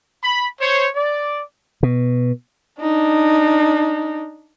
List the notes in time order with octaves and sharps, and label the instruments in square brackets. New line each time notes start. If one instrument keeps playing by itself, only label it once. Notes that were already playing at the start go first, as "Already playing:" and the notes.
[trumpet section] B5
C5 C#5
D5
[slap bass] B2
[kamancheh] D4 D#4